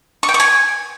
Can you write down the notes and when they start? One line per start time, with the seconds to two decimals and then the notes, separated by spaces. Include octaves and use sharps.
0.23 C#6
0.29 G5
0.34 C#6
0.40 G#5